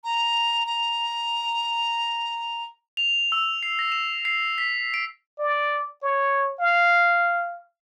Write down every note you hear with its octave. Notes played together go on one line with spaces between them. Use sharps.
A#5
A#5
F7
E6
C7
A#6
E7
C7
B6
D7
D5
C#5
F5